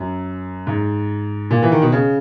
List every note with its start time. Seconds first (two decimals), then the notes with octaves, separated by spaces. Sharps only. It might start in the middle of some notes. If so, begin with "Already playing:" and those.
Already playing: F#2
0.67 G#2
1.51 A#2
1.62 E3
1.71 D#3
1.82 B2
1.92 C#3